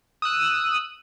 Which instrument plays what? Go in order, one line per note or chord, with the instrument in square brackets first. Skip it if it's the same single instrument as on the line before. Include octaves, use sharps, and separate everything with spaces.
[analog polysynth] D#6 E6 F#6 D#7